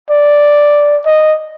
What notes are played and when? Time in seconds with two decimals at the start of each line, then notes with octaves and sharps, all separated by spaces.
0.10 D5
1.06 D#5